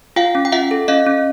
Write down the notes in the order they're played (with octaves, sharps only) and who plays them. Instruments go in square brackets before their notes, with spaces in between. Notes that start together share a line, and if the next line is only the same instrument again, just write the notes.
[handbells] F4 F5 G5
C#4
G5
F4 E5 F#5
A4
C#4 D#5 F5
C#4